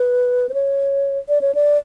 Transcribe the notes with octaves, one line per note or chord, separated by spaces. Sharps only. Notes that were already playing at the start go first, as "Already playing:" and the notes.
Already playing: B4
C5
C#5
D5
C#5
D5